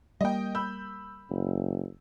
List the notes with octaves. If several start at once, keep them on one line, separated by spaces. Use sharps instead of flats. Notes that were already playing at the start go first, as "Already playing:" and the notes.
G3 A#3 D#5 G5
B5 E6 G6
F#1